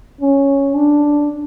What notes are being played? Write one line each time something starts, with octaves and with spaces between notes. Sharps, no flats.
C#4
D4